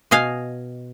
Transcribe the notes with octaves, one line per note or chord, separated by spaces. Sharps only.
B2 D#5 F5 G#5